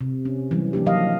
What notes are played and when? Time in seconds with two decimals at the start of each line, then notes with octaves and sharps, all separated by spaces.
0.01 C3
0.25 C#4
0.51 E3 F#3 G3
0.73 F3 A#3 D4 G4
0.86 E3 F#3 D#5 F5